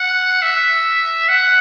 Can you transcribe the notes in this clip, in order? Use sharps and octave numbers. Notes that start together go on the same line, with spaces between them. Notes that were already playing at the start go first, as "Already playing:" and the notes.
Already playing: F#5
E5
F#5